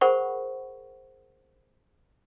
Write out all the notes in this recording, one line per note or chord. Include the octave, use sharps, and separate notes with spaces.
G#4 A#4 C5 F#5 B5 C#6